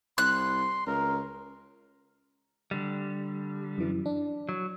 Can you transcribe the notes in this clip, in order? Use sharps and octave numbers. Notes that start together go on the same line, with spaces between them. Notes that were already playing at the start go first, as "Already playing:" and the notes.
C2 C6 F#6
C#2 A#4
D3 G3
F#2 E3
D4
F#3